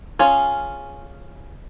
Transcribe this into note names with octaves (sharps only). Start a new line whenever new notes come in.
C#4 F4 G#4